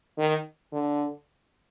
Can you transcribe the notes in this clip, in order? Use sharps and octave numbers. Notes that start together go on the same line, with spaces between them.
D#3
D3